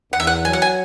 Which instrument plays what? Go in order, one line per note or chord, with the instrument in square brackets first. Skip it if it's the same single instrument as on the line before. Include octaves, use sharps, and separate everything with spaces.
[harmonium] E2 [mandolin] F#5
[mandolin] E5
F#5
[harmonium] F#3 [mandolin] G#5
[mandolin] F#5
G#5